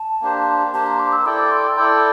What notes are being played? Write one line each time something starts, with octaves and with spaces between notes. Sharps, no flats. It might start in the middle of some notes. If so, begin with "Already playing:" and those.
Already playing: A5
A#3 D4 G4 C5
A#3 D4 G4 C5 A5
A#5
D6
E6
E4 A4 D5 G5 D6
C6
E4 A4 D5 G5 A5